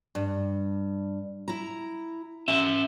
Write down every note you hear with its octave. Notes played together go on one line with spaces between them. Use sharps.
G2
E4 A#5
E3 C#4 E5